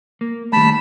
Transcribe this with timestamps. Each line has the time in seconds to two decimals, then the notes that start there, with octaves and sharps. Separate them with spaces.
0.21 A#3
0.53 D#3 G3 A3 A5 B5